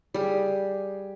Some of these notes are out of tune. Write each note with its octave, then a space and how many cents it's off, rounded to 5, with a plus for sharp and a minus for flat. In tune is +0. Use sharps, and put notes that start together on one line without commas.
G3 +0 G#4 +0